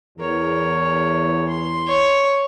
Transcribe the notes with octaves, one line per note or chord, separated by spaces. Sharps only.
E2 A#4 C#5
C6
C#5